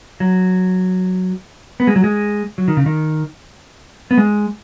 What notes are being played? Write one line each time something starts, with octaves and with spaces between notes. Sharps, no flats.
F#3
B3
G#3
F#3
G#3
F#3
D#3
C#3
D#3
B3
G#3